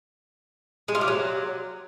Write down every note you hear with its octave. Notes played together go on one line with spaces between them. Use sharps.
G#3
F4
G4
F#3